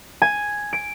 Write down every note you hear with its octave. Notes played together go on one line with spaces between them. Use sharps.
G#5
D7